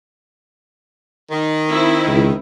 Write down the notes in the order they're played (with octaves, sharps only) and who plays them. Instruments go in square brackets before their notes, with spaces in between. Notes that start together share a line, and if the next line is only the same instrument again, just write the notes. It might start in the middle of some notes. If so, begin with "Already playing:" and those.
[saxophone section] D#3
[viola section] C4 E4
[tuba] C#2